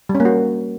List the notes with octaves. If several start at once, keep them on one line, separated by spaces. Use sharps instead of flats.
G3
C#4
A#3
F#4